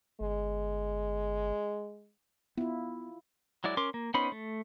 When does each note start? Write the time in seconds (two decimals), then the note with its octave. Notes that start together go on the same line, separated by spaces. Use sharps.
0.20 G1 G#3
2.57 B3 E4 F4
3.64 F#3 G#3 E4 D5
3.77 C#4 A#4 C6 D6
3.94 A#3
4.14 B3 C#4 D#4 C5 B5
4.32 A3